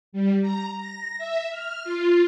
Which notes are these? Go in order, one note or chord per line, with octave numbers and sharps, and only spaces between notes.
G3
A#5
A#6
E5
F6
F4